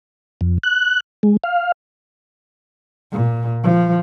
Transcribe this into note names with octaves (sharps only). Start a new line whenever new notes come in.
F2
F#6
G#3
F5
A#2
F3